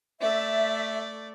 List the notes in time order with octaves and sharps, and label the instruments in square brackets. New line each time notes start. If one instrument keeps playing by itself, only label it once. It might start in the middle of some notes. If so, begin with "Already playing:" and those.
[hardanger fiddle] A3 D5 [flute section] E5